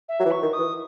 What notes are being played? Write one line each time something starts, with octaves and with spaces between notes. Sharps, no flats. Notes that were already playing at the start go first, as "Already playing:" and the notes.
E5
F#3
E3
C#6
D#3
D#6
E3